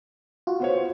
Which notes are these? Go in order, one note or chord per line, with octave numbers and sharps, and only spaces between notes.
F4 F#4
B3 C5 C#5